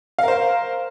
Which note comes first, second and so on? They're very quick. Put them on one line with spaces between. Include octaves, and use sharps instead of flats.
F5 A#4 C5